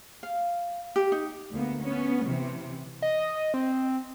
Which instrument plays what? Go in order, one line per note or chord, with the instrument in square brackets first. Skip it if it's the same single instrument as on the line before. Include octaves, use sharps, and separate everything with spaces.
[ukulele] F5
G4
D#4
[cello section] D2 A#3 B3
B3 C#4
C3 E3
[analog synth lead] D#5
C4